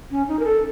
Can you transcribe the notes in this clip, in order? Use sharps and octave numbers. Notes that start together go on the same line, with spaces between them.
C#4
D#4
A#4
A4